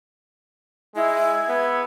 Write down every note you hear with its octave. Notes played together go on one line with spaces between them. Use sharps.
G#3 E4 G#6
B3